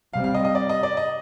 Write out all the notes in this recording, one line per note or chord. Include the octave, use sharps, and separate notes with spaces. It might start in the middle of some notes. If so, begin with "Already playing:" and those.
C3 G3 C4 F5
F5
D#5
D#5
D5
D#5
D5
D#5